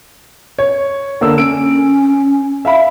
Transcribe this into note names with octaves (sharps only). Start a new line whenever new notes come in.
C#5
D3 A#3 A4 E6
C#4 D7
E5 F5 B5